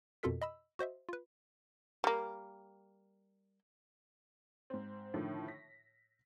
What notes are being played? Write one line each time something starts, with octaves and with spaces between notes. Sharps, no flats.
F2 B2 F4 A4 A#4 B6
D#5 B5 E6
F#4 C5 D#5 E5
F4 B4
G3 A#3
G#2 C4
A2 D3 D#3 F3 A3
A#6 B6